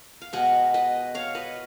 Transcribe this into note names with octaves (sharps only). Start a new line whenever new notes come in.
F5
B2 G#3 B3 D#5 F#5
B4 D#5
C#5 F5
B4 D#5